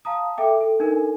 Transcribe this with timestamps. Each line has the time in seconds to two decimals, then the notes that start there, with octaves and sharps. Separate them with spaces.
0.05 F5 A5 A#5 D#6
0.37 A4 E5 G5 D6
0.61 A4
0.80 D4 D#4 A4 A#4 G#5